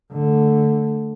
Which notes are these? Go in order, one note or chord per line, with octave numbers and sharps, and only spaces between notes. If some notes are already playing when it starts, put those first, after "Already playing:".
D3 A3